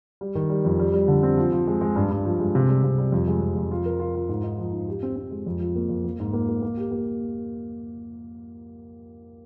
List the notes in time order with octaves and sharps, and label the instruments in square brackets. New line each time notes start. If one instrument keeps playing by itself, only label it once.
[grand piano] G3
D#3
G3
F2
G3
G3
D3
C4
F3
F3
G#3
G#3
G2
G2
F3
G#3
C3
G3
C3
G3
F2
G#3
F2
F2
F4
A#4
F4
F4
G#2
D#4
F3
G#2
G4
C4
C4
G#3
F2
F4
A#3
F2
A#3
G#2
A#3
A#3
A#3
G4
A#3